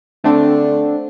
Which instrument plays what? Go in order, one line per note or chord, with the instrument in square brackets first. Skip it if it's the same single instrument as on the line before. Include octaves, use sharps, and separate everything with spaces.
[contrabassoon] D3 [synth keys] A3 C4 D4